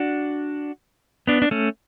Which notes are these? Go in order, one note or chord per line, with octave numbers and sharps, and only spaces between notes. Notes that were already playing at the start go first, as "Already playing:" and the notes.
Already playing: D4 F#4
B3 D4
D4
A3 C#4